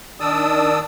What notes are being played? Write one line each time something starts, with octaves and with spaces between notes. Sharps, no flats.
D#3 D4 D5 D#6 E6